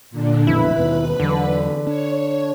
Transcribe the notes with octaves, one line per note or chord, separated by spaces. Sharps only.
A#2 D3 D4
A1 F2 B2 E4 B4 B5
D#2 B2 D#3
E2 D3 F#3
D4 C#5